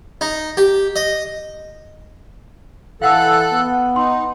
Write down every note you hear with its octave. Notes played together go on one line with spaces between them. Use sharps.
D#4
G4
D#5
E3 A4 F5 F#5 E6 F#6
B3
D#4 C6